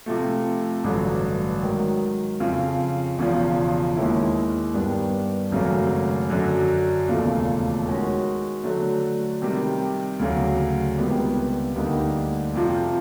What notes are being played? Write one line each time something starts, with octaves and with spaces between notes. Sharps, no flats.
C3 F3 A3
A1 G2 D3 F#3
G#2 D#3 F#3
F2 C#3 F3
E1 E2 C#3 F3
D#2 D#3 G#3 C#4 E4
G2 D#3 G3 B3 D4
G#1 F#2 C#3 F#3 A3
F#2 D3 F#3
E1 D#2 C#3 F3 A3
D#3 G#3 C#4 F#4
D3 F#3 A3
C3 D#3 G3
D2 C#3 F#3
C#2 C3 D#3 G3 B3
D2 D3 G3 A#3 D#4
F2 C3 F3